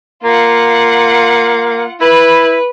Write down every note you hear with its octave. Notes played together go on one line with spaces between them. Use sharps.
A#3 F4 F#5
E4 B4